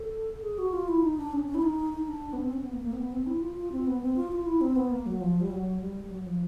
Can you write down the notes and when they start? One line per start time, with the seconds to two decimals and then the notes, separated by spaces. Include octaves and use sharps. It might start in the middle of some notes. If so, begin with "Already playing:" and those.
Already playing: A4
0.43 G#4
0.58 F#4
0.73 F4
0.88 E4
1.03 D#4
1.18 D4
1.33 C#4
1.48 C#4
1.55 E4
1.62 D#4
1.93 D#4
2.08 D4
2.33 B3
2.42 C4
2.53 C#4
2.63 B3
2.72 A#3
2.83 A#3
2.93 C4
2.97 B3
3.12 C4
3.27 E4
3.42 F4
3.57 F4
3.72 C4
3.87 B3
4.01 C4
4.16 F4
4.32 F4
4.46 E4
4.61 C4
4.76 B3
4.91 A#3
5.06 F#3
5.21 F3
5.41 G3
5.51 F#3
5.81 G3
6.05 G3
6.11 F#3
6.26 F3